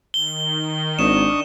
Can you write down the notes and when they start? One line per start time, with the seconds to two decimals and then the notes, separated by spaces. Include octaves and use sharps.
0.14 D#3 G7
0.99 G#1 D4 C#6 D#6 E7